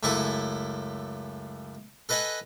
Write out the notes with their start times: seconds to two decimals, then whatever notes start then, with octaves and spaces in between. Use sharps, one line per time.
0.03 C#2 F#2 A3 E4 C#5 G#5
2.09 A4 B4 D#5 F#5 G#5